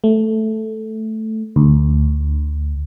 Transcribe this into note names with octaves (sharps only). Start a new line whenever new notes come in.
A3
D2